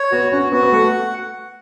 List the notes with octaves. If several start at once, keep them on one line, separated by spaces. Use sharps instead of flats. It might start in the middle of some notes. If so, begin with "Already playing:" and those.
Already playing: C#5
B3 F#4
C#4 F#4
B3 F#4
B3
A3 F#5